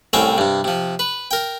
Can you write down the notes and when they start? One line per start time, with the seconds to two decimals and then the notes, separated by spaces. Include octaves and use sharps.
0.13 C2 A2 C4 C#4 G5
0.38 G2 C3
0.64 C3 F3
0.99 B4
1.31 A#4 G5